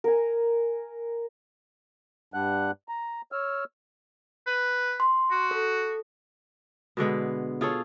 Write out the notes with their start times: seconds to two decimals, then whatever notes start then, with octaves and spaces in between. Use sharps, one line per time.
0.04 A#4 G#5
2.34 G2 G3 D4 F#5 F#6
2.89 A#5
3.32 C#5 E6 F6
4.47 B4
5.00 C6
5.31 F#4
5.51 A4
6.97 B2 D3 G#3 B3
7.61 F4 G#4 A4 C#5